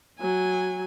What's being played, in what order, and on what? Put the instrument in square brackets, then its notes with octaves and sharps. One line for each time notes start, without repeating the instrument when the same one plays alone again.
[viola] F#3 G#5